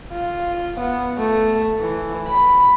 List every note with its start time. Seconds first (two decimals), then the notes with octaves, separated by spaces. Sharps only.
0.13 F4
0.80 B3
1.18 A3
1.81 E3
2.28 B5